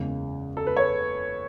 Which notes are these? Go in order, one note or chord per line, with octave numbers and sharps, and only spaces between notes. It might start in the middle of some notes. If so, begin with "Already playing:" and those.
Already playing: F#1 E2 C#3 G#3
A4
B4
C#5